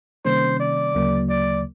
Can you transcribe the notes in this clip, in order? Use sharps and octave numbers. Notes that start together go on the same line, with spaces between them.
C3 D#3 G3 A#3 C#4 C5
D5
D2 C#3 F#3 A#3
D5